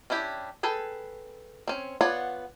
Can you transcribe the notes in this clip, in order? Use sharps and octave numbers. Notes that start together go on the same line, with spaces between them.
C#4 D4 E4 G4
G#4 A4 B4 G5
C4 C#4
B3 F4 C#5 D5 F#5